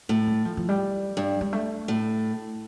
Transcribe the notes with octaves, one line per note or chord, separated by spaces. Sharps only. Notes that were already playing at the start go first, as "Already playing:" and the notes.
A2 G3
G3
F3
F3
G3
G2
G3
A3
A2